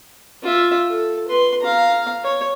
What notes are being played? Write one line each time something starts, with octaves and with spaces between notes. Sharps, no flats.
F4 E5
A4
B4 C6
F5 A#5
C#5